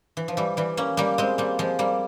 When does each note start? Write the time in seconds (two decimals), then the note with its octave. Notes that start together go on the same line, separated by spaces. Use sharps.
0.17 E3
0.28 F3
0.37 E3 G3
0.57 E3 G3
0.77 A#3 C#4
0.97 G3 A#3
1.18 G#3 C4
1.38 G3 A#3
1.59 F3 G#3
1.79 G3 A#3